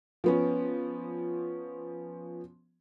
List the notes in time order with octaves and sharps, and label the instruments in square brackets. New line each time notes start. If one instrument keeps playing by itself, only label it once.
[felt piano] F3 B3 C#4